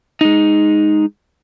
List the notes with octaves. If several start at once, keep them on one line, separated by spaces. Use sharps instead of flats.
G#3 D#4